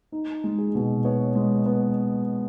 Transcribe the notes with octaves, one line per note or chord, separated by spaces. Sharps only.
D#4
G#3
G#4
B2
B3 C#5
G#3
B3